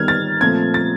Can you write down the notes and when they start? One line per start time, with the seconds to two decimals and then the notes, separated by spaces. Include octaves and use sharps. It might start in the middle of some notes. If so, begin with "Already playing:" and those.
Already playing: D#3 G3 B3 F6 G#6
0.08 A6
0.41 A#2 F3 A3 C4 G#6
0.74 A6